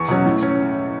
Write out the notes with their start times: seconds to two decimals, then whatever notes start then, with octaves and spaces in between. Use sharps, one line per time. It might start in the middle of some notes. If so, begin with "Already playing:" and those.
Already playing: E2 C#6
0.09 B2 F#3 C#4
0.26 A2
0.43 C#4